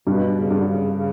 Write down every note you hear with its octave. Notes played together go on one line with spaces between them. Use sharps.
G2 B2
C#3
G2 D3
C#3
C#3